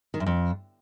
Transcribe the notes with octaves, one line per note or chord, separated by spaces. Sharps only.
D#3
F#2
F2